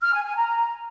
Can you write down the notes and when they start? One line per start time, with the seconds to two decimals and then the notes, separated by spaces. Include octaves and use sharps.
0.01 F6
0.13 G#5
0.25 G#5
0.36 A#5